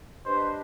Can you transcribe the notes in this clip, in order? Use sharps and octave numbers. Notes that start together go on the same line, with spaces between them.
D4 G4 B4 C5 D#5